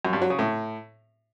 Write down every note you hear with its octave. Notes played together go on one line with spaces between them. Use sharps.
F#2
G2
F#3
C#3
A2